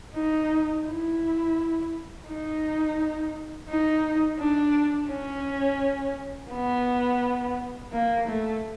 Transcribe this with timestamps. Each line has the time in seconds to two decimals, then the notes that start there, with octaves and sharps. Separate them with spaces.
0.15 D#4
0.86 E4
2.28 D#4
3.69 D#4
4.40 D4
5.10 C#4
6.51 B3
7.93 A#3
8.28 A3